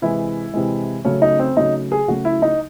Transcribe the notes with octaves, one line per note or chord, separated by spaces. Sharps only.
C3 E3 G#3 E4
C3 E3 G#3
C#3 F#3 A3 C#4
D#4
C4
C#3 F#3 A3 D#4
G#4
C#3 F#3 A3 F#4
E4
D#4